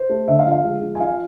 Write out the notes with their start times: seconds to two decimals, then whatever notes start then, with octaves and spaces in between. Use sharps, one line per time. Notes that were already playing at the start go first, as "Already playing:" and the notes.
Already playing: C5
0.09 A3
0.28 D3 E5
0.39 F5
0.46 F3
0.51 F5
0.64 G#3
0.82 F3
0.95 G#5
1.00 F3 F5